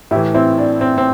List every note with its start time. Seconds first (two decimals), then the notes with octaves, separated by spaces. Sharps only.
0.11 A2 E4 G4
0.16 E3
0.34 C4 E4
0.58 D4
0.81 C4
0.98 C4